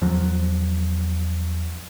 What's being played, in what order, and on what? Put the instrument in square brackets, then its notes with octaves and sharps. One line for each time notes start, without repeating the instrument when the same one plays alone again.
[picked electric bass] E2 F3 F#3